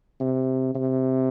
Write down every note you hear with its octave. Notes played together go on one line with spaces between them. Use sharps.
C3
C3